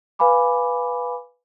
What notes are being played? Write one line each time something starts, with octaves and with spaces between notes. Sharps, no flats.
B4 F5 G#5 B5 D6